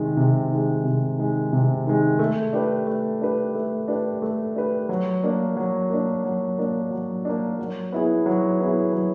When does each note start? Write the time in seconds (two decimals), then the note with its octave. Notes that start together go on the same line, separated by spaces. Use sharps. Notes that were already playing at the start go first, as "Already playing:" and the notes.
Already playing: C3 D#3 G#3
0.17 C3
0.51 D#3 G#3
0.84 C3
1.18 D#3 G#3
1.53 C3
1.86 D#3 G#3
2.19 A3
2.53 D4 G4 B4
2.87 A3
3.21 D4 G4 B4
3.55 A3
3.88 D4 G4 B4
4.22 A3
4.56 D4 G4 B4
4.89 F#3
5.23 A#3 D4
5.57 F#3
5.90 A#3 D4
6.25 F#3
6.58 A#3 D4
6.91 F#3
7.25 A#3 D4
7.59 F#3
7.92 B3 E4 G#4
8.26 F#3
8.60 B3 E4 G#4
8.93 F#3